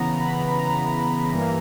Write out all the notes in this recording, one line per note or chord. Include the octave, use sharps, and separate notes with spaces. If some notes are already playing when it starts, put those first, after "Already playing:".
Already playing: C#3 E3 B3 A#5
B5
A#5
G2 E3 A#3